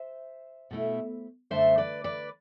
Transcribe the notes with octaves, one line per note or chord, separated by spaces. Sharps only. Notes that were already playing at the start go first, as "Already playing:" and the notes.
Already playing: C5 E5
B2 A3 E4
F#2 D3 A3 D4 C5 E5
B4 D5
B4 D5